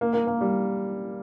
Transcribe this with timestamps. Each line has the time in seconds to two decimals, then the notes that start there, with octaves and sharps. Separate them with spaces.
0.01 A#3
0.13 A#3
0.27 A#3
0.41 G3